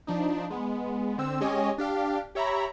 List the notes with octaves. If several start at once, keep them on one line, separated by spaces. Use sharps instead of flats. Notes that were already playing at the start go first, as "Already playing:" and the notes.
F3 D4 D#4
G#3 B3
D3 C4 E6
G#3 C#4 G4 C#5 D#5 G#5
D4 G4 F5
G4 C#5 E5 A#5 B5